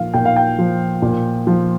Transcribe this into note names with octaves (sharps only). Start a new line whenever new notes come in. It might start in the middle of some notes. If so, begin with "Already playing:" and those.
Already playing: A#2 F3 F5
A#2 G5
F5
G5
F3
A#2
F3